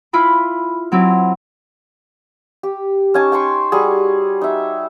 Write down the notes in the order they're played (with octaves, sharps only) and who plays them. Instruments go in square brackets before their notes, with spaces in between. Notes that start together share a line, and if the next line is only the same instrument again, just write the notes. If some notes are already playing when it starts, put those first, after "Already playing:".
[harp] E4 F4 B5
F#3 C4 E4
[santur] G4
C#4 D#4 G#5 A5
G5 A5 C6 C#6
G3 F#4 G#4
D#4 E5